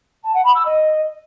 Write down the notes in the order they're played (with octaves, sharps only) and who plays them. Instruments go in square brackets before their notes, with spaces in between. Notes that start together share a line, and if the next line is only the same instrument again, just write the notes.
[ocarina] A5
F#5
B5
E6
D#5